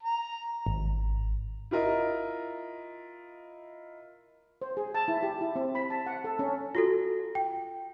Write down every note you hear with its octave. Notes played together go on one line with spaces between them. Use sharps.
A#5
G#1
E4 F4 A#4 D#5
C5
G#4
A5
E4
G4
E4
C4
B5
A5
F#5
A4
C#4
F4 F#4 A4
G5